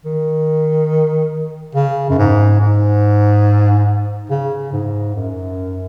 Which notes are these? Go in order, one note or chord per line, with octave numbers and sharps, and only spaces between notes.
D#3
C#3
F#2
G#2
G#2
C#3
G#2
F#2